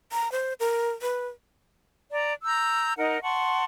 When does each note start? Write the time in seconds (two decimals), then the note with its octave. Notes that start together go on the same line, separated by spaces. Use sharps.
0.12 A#5
0.32 C5
0.60 A#4
1.02 B4
2.12 D5 A#5
2.44 A#5 E6 G6
2.97 D#4 A#4 D#5 F#5
3.22 F#5 A5 C6 C#6